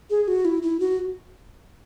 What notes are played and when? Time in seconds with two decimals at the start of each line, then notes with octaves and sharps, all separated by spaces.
0.10 G#4
0.28 F#4
0.45 E4
0.62 E4
0.80 F#4